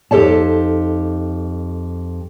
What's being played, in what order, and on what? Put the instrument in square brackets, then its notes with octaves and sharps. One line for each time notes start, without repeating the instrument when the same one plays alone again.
[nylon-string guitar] F2 D#4 G4 A4 D5 A5